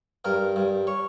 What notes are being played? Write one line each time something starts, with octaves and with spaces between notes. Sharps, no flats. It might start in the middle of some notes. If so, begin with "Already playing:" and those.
G2 A#4
G2
C#5